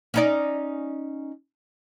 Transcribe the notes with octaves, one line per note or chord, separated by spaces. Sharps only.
C#4 D#4 D5